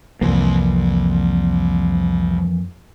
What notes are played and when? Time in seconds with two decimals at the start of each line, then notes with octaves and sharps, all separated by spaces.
0.21 C2 F2 E3 A#3